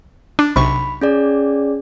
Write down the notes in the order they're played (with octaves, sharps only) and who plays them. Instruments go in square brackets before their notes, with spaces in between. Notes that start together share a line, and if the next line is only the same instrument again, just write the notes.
[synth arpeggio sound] D4
[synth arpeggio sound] B1 C3 C#6 [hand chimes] B5
[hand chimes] C#4 G#4 D5